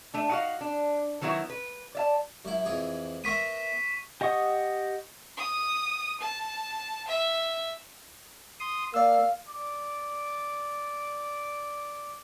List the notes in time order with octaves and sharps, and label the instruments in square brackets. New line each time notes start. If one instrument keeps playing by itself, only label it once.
[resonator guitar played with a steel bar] A3 D4
D#4 F#4 F5
D4
D#3 F#3 B3 E4 F#4
B4
D5 E5 A5
[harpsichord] F#2 E4
F2 E3 G#4
[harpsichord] B3 A#4 E5 [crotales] C#6 B6 D#7
[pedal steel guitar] G4 D#5 F#5 C#6 D#6
[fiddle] D#6
A5
E5
[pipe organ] C6 D#6
[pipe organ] A#3 [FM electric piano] D5 E6 [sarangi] F5
[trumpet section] D5 D6